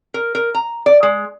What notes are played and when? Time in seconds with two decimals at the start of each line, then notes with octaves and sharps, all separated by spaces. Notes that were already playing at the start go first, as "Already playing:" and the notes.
0.14 A#4
0.35 A#4
0.54 A#5
0.86 D5
1.03 G#3